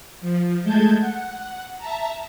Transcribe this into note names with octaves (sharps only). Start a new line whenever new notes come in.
F3
G#3 A3 A5 G6 G#6
F#5
E5 A5 A#5